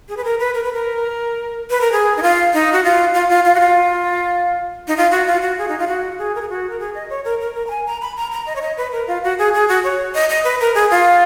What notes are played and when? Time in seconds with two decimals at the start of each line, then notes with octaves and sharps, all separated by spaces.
0.09 G#4
0.17 B4
0.24 A#4
0.40 B4
0.55 A#4
0.64 B4
0.74 A#4
1.70 B4
1.81 A#4
1.92 G#4
2.17 D#4
2.22 F4
2.54 D#4
2.72 F#4
2.84 F4
3.14 F4
3.29 F4
3.45 F4
3.55 F#4
3.60 F4
4.88 D#4
4.97 F4
5.11 F#4
5.27 F4
5.42 F#4
5.58 G#4
5.68 D#4
5.79 F4
5.88 F#4
6.18 G#4
6.35 A#4
6.41 G#4
6.50 F#4
6.70 A#4
6.80 G#4
6.95 D#5
7.10 C#5
7.24 A#4
7.41 A#4
7.55 A#4
7.67 A#5
7.70 G#5
7.86 A#5
8.01 B5
8.17 A#5
8.32 A#5
8.46 D#5
8.56 C#5
8.62 D#5
8.77 B4
8.92 A#4
9.08 F4
9.23 F#4
9.38 G#4
9.54 G#4
9.69 F#4
9.84 C#5
10.15 D#5
10.29 D#5
10.44 B4
10.61 A#4
10.75 G#4
10.91 F4